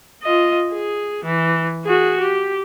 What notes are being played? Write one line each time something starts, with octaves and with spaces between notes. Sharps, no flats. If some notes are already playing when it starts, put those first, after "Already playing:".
F4 D#5
G#4
E3
F#4 G#4
G4